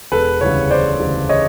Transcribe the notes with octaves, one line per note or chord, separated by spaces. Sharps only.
E1 A4 B4
D2 C#3 E3 G3 B4 C#5
E1 C5 D5
D2 C#3 E3 G3
C#5 D#5